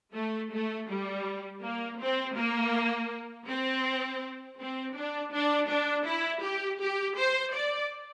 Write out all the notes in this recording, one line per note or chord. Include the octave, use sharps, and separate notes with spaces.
A3
A3
G3
A#3
C4
A#3
C4
C4
D4
D4
D4
E4
G4
G4
C5
D5